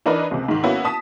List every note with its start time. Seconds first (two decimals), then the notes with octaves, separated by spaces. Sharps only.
0.06 E3 D4 D#4 A#4 B4
0.31 C#2 C3
0.48 G#2 D#3
0.63 A#3 B3 C#4 E4 F#4
0.85 A5 D#6 B6